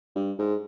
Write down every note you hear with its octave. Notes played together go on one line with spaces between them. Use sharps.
G2
G#2